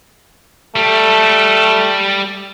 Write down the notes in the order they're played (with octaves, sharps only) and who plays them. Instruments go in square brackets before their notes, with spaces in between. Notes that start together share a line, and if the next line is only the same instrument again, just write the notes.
[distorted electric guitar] G3 [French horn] A3